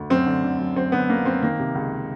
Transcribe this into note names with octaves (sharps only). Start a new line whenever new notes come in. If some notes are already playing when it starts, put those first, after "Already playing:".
Already playing: D2
F#2 C4
D3
D3
F#2
F#2 C4
D3 B3
D3 A#3
F#2 C4
D#3 A#3
C3
C#2